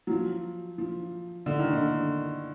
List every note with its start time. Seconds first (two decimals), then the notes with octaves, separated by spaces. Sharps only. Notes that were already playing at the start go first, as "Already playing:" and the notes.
0.07 F#3
0.11 F3
0.78 F3
1.46 D3
1.59 D#3
1.73 D3